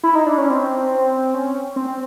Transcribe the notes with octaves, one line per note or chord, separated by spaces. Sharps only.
E4
D#4
D4
C#4
C4
C#4
C4